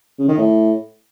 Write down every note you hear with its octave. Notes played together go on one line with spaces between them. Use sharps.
C#3
D#3
A2